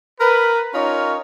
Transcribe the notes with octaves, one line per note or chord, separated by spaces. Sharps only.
A#4 B4
C#4 D#4 F4 A#4 C#5